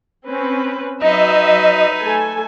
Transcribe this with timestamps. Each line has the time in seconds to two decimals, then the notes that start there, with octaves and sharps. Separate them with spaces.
0.26 C4 C#4 B4
1.02 F#3 D#4 B4 D#5 E5
2.02 A3 A4 G#5